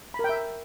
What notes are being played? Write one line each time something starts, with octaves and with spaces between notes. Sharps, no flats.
A#4 E5 G5 B5